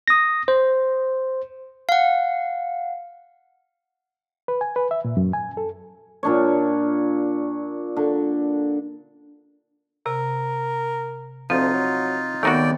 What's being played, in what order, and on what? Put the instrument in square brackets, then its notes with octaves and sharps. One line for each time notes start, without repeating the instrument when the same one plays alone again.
[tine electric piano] D#6 A#6
C5
[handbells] F5 F#5
[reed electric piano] B4
G#5
B4
E5
A#2
F#2
G#5
A4
[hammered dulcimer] A#2 D4 C#5
D3
[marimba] C3 [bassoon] A#4
[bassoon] D2 [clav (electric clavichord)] F3 [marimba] C4 [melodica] D#4 F4
[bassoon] F#3
[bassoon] D#2 [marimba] D#3 B3 [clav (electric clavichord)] A3 D#4 F#4 [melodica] D5 G5